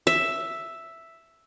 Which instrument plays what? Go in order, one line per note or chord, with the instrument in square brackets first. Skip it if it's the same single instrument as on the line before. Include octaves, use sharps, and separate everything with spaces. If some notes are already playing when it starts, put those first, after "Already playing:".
[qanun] E5